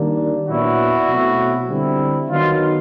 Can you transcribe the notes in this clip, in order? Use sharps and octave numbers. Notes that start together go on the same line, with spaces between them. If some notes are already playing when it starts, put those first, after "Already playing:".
Already playing: D#3 G3 A#3 D4
A#2 F#3 B3 D4 E4 F#4
B2 F#3 A3 C4 E4
D3 G3 C4 E4
D#3 F#3 B3 D#4 F4